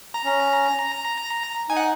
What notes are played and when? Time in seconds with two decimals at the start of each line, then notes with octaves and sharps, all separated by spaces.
0.14 A#5
0.25 C#4
1.70 D#4 G#5
1.77 F#5